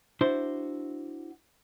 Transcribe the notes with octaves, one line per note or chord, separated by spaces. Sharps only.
D4 E4 F#4 C5